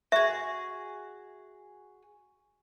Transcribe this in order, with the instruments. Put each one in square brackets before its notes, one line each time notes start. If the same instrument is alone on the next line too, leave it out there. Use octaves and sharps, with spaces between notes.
[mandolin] F#4 G#4 [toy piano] E5